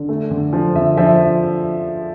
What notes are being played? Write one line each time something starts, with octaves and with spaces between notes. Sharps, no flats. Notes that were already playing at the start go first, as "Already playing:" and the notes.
Already playing: D3
A3
D3
F3
D3 E5
F3 E5